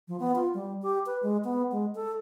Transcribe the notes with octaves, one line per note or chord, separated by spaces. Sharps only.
F3
B3
F4
G3
G4
B4
G#3
B3
G#3
A4